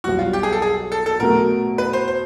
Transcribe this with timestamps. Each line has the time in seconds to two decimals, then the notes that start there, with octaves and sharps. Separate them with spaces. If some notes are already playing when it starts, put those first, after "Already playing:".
0.04 B1 B2 G3 F#4
0.19 F4
0.33 G4
0.43 G#4
0.52 A4
0.62 G#4
0.92 A4
1.06 A4
1.20 B2 F#3 A3 A#4
1.78 B4
1.93 C5
2.08 C5